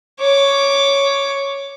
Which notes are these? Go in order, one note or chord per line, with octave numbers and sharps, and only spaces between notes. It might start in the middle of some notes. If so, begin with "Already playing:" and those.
C#5 D6